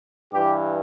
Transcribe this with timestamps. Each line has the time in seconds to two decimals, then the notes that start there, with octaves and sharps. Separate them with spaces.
0.32 G2 E3 G4